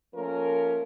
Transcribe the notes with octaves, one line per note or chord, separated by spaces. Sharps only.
F3 A3 A#3 C#4 A#4